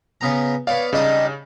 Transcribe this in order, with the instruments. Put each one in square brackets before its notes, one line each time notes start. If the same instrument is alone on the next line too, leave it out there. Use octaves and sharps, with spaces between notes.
[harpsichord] C#3 B3 A#5
[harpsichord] B3 C#5 D5 [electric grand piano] F5
[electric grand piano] C#3 [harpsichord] G3 D4 D#4 [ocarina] D#5